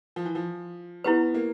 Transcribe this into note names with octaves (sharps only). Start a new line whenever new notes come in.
F3
E3
F3
B3 E4 G4 B4
A#3